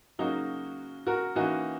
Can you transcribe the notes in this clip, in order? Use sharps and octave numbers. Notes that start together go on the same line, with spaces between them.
C#3 F#3 A#3 C#4 D#4 F#4
F#4 A#4
E3 A#3 C#4 D#4 F#4